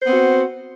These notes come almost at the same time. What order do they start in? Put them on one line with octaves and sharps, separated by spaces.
C5 B3 C4 F#4